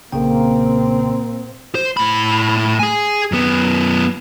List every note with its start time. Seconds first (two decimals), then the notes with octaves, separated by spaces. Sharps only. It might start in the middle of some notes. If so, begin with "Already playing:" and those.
0.12 B1 A#2 C#3 A#3 C4 G5
1.75 C5
1.97 A2 B5
2.79 G#4 G#5
3.32 F#2 B3